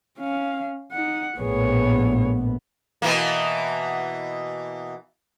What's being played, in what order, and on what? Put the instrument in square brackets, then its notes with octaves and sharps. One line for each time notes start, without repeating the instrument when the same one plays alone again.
[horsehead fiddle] C#4 F5
D#4 F#5
[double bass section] A#1 A2 B3 [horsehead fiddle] G#4 C#5
[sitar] B2 E3 A#3